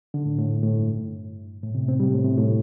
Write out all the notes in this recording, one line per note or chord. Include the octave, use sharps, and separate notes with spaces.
D3
A2
A2
A2
G2
A2
C3
C4
G3
A2
C3
A2